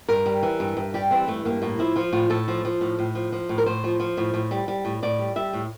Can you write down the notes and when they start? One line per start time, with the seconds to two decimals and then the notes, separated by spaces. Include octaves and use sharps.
0.09 G2 A#4
0.26 G3
0.43 E3
0.60 G2
0.77 G2
0.94 G3 G4
1.11 E3 C4
1.28 G2 A3
1.45 G2 A#3
1.62 A2 A#3
1.79 F3 E4
1.96 F3 F4
2.13 A2 F4
2.30 A2 A4
2.48 F3
2.65 F3
2.81 A2
2.99 A2
3.15 F3
3.32 F3
3.49 A2
3.58 A#4
3.66 A2 C5
3.84 F3
4.00 F3
4.17 A2
4.34 A2
4.51 G3
4.68 G3
4.85 A2
5.03 A2 D5
5.19 G3
5.36 G3 E5
5.53 A2